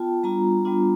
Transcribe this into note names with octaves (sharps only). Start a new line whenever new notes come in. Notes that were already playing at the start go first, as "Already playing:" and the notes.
Already playing: B3 F4 G5 A5
G3 B3 D4 F4 A#5
G3 B3 D4 F4